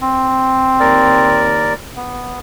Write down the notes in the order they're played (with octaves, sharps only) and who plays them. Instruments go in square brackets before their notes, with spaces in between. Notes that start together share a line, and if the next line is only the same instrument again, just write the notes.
[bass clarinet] C4
[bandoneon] D#2 A#4 D5
B3